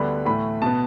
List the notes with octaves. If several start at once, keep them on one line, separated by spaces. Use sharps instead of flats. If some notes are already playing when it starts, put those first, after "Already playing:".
Already playing: D2 D3 G3 B3 B5
A2 E3 A3 B5
B2 B3 A5